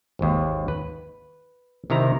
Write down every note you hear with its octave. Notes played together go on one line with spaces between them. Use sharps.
G#1 D#2
B4
C3 D#3 E4 A#5